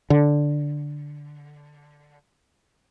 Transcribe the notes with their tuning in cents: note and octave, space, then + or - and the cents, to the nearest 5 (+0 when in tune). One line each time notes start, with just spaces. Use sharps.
D3 +0